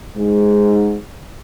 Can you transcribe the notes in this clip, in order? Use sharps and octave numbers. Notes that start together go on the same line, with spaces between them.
G#2